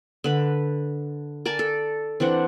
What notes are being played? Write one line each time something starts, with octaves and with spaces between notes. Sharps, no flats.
D3 B4 B5
A#4 D5 G#5 A5
A4
E3 C4 D4 F#5